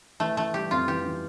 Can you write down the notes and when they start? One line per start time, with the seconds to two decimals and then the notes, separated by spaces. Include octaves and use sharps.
0.20 E3 A3
0.37 E3 A3
0.54 G3 G4
0.71 F2 F4
0.88 E3 G4
1.05 E3